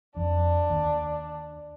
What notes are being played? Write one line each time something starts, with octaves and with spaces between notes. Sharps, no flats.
F2 D4
D#2